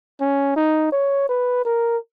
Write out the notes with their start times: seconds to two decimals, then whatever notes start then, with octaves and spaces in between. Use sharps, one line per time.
0.20 C#4
0.56 D#4
0.92 C#5
1.28 B4
1.65 A#4